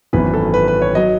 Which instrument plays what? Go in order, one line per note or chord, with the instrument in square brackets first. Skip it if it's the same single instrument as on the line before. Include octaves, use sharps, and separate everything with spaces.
[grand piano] G#1 F#2 E3 B3 B4
A4
B4
B4
C#5
F#3 D#5